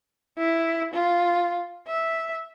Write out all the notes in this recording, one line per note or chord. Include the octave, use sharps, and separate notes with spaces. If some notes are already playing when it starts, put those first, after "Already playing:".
E4
F4
E5